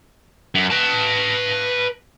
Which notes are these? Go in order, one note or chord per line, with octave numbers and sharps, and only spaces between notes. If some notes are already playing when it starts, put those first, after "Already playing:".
F#2
B4 A5